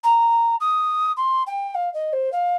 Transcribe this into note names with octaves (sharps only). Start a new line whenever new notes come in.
A#5
D#6
C6
G5
F5
D#5
C5
F5